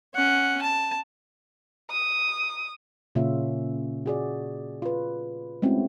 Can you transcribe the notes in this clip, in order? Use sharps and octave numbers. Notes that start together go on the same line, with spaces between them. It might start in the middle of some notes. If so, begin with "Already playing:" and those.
C#4 F#5
A5
D#6
A#2 C#3 A#3 C#4 F4 E5
F#4 G#4 D5
F4 B4
G#3 A3 C4 C#4 E4 F#4